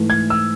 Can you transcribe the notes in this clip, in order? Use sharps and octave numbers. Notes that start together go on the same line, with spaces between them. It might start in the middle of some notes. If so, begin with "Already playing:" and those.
Already playing: G#2 E3 A3
G#6
E6